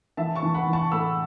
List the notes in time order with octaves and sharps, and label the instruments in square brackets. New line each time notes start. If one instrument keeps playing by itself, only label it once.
[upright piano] E3 E5 A5
A5 C#6
E3
F#5 B5
E3
A5 C#6
A2 B5 E6